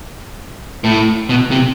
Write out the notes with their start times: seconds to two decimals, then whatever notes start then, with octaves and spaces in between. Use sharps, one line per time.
0.84 A2
1.29 B2
1.51 C3